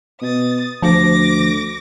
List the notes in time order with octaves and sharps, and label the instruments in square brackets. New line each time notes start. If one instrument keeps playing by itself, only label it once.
[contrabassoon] B2 [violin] D#6 A6
[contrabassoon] D2 [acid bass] F3 [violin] D6 A#6